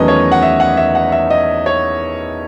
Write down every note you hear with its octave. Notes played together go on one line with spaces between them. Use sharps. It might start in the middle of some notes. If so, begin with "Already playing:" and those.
Already playing: E2 D#3 F#3 A3 C#4 B4 D#5
C#5
F#5
E5
F#5
E5
F#5
E5
D#5
C#5